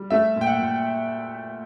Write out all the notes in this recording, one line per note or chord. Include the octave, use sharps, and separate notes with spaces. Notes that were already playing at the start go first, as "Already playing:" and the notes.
Already playing: G3
A3 E5
A#2
G5
F#5
A#2